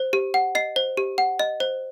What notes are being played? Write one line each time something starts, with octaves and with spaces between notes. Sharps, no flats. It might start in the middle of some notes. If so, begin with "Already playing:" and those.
Already playing: C5
G4
F#5
D#5 C7
C5
G4
F#5
D#5
C5